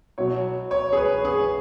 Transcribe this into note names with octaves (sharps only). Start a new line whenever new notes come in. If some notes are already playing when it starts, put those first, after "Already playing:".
B2 F#3 C#5
C#5
G#4
B4
G#4